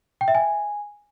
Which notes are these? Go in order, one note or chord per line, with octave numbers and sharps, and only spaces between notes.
G5
E5
G#5